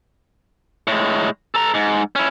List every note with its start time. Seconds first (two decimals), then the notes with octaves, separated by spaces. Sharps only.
0.87 A2 G#3
1.55 A4 A#5
1.74 G#2
2.16 C#4 E4